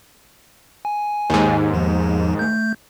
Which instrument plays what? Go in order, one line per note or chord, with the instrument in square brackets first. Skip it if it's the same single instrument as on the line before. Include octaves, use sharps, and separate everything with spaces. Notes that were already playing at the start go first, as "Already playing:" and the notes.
[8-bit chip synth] G#5
[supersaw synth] D#2 G#2
[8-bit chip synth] E2 F3
A3 G6